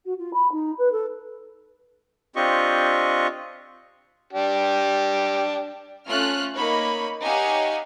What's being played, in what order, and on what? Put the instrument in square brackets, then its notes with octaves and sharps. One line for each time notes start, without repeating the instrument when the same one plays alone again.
[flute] F#4
F4
B5
D#4
B4
A4
[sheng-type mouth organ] C4 D4 F4 G4 D#5 C#6
[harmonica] D4 G4
[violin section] A3 C#4 F4 F6 F#6
A#3 D#4 C#5 B5
D#4 G4 C#5 F5 F#5 G#5